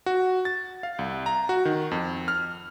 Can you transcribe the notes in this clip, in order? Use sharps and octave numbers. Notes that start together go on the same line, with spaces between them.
F#4
A6
F5
C2
A#5
F#4
D#3
F2
F6